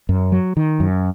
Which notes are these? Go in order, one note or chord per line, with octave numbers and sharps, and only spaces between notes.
F#2
F#3
D#3
F#2